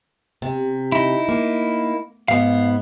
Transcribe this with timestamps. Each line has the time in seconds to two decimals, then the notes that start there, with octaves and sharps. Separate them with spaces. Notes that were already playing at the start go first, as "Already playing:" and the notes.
0.42 C3
0.92 D#4 E4
1.29 A#3
2.28 G#2 B3 F5